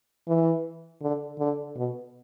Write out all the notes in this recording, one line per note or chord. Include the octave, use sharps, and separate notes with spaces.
E3
D3
D3
B2